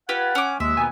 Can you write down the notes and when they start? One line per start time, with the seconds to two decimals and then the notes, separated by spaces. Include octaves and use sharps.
0.09 F4 G4 B4 F#5 G#6
0.35 C#4 D6
0.60 D#2 G#3 E5
0.77 B2 D#3 B3 G#5